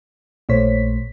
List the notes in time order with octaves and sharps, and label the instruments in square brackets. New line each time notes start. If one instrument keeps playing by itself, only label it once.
[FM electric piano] A#1 A#2 A3 C5 C#5 B6